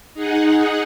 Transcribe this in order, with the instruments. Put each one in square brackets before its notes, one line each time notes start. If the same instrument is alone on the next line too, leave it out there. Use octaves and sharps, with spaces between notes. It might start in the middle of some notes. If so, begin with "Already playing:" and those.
[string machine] D#4 G#4 F#5